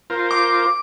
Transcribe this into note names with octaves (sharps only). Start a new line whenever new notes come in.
F4 A#4 C5
D6